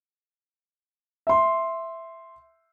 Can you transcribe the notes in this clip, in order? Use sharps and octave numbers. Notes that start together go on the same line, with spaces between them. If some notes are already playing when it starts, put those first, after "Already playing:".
E5 C6